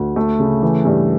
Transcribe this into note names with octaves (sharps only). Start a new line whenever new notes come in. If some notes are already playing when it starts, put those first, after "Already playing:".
Already playing: D2
A3
C#3
E3
G2